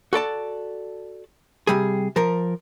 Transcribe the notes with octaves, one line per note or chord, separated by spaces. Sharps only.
F#4 A4 D5 A5
C3 G3 G#4
F3 A#4